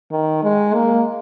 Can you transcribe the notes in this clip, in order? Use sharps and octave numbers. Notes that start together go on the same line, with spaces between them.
D#3
G#3
A#3